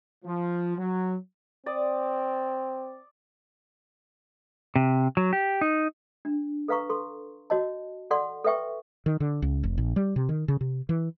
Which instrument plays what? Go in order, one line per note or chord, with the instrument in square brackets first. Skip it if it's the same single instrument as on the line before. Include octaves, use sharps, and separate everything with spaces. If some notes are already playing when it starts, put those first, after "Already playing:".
[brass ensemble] F3
F#3
[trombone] C4 [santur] D5 D#6
[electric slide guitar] C3
F#3
G4
D#4
[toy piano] D4
A4 B4 F5 A#5 C#6
A4 C6
F#4 C#5 D#5 A5
A4 D5 F#5 C6
A4 B4 E5 G5 C#6
[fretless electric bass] D#3
D3
C#2
F1
A#1
G3
C3
D#3
C#3
C3
E3